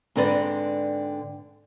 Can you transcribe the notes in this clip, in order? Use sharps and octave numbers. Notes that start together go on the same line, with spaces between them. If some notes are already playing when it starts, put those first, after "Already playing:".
G#2 D3 C4 B4 D5